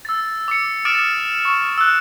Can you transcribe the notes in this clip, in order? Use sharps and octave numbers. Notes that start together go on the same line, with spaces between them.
E6 A6
D6 C#7
D6 D#6 F6 A6 D7 E7
C#6
E6 F#6